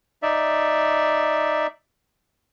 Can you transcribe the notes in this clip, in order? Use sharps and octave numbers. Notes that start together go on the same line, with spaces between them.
D#4 D5 E5